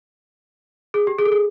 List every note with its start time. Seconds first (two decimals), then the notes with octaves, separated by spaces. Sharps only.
0.94 G#4
1.07 G4
1.19 G#4
1.25 A4
1.32 G#4